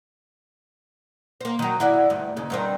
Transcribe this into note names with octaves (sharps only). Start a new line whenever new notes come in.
A#3 C5
D#3 F#3
E4 F#4 D5
D2 G2
D#2 C#3
G2 D#3 C4